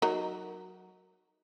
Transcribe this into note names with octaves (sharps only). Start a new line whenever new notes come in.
F#3 D#4 A#4